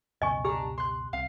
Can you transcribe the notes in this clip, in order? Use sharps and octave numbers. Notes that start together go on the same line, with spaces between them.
C#2 F#2 B2 D#5 G#5 C#6
D4 G4 A#5
C6 F#6
C2 C3 F5